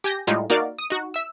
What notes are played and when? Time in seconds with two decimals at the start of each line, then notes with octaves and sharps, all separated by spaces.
0.04 G4 G#5 G6 A#6
0.27 A2 G3 G#3 D#4 F4
0.50 A#3 D#4 F#4 A#4 D5 F5
0.79 D#6
0.90 D#4 F#4
1.14 E5 E6